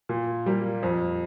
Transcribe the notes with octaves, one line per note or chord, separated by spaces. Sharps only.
A#2
G3 A#3
F2